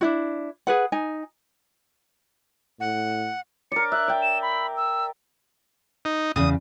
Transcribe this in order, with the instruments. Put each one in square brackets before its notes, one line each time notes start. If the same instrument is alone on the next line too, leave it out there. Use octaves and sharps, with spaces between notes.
[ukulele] D4 E4 F#4
G#4 B4 F#5
D#4 G#5
[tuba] A2 [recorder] F#5
[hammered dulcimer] A#4 D5 [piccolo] C#7
[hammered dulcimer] E5 [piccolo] F#6
[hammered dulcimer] D5 G5
[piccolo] E7
B5
E6
[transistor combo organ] D#4
[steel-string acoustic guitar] E2 C#3 [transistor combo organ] D#6